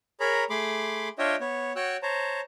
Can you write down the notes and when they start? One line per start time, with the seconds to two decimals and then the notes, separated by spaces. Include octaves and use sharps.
0.20 G#4 A#4 C#5 A#5 B5
0.50 A3 G#4 B5 C6 D6
1.18 D4 F4 C#5 D#5 E5 G5
1.40 B3 C#5
1.76 F#4 C#5 G5 E6 F#6
2.03 C5 C#5 A5 A#5